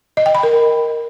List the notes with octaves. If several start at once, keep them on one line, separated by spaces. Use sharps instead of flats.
D#5
G5
B5
A#4